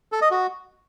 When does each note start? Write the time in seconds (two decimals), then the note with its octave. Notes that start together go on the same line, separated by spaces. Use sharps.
0.12 A4
0.22 D#5
0.31 F#4